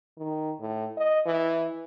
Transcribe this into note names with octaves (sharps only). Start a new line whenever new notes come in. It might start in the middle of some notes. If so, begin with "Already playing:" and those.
D#3
A2
D#5
E3